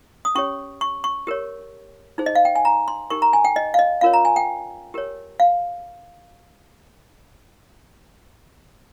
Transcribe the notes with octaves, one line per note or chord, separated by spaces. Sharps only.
D#6
C#4 G4 C#5 C#6
C#6
C#6
G4 A#4 C#5
D#4 G#4 C5
D#5
F5
G5
G#5
A#5
C6
D#4 G4 A#4 C#6
A#5
G#5
G5
D#5
F5
D#5
C#4 F4 A#4 C#5 F5
A#5
G#5
G5
G4 A#4 C#5
F5